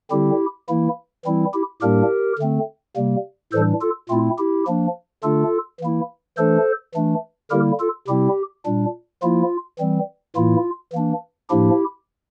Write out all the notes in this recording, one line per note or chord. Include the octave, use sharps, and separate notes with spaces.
D3 G3 C4 E4 G4
E3 A#3 E4
E3 G3 C4 E4
E4 G4
A2 G3 A#3 D4 G4 A#4
D3 A3 C4
C3 G3 A#3
A2 E3 G3 D4 A4 C5
F4 A4
A#2 A3 C4 E4 F4
E4 G4
F3 A#3 D4
D3 A3 D4 F4 A4
E3 A#3 E4
E3 A3 D4 A4 C5
E3 A3 D4
D3 G3 A#3 E4 G4 A#4
F4 A4
C3 G3 C4 E4 G4
A#2 G3 D4
F3 A#3 E4 F4
E3 G3 C4
A2 E3 A#3 E4 F4
E3 A#3 D4
A2 F3 A#3 D4 E4 G4